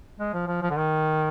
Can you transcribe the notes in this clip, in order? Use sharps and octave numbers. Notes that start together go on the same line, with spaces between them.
G#3
F3
F3
F3
D3
D#3